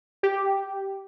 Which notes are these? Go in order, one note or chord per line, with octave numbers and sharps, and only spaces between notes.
G4